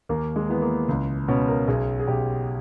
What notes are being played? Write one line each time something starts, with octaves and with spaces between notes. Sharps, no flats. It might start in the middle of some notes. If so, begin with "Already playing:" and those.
D#2 A#3
G#3
E3 B3
A#3
C#2
B2 C#4
A#4
B1 G#4
G#4
B1 G4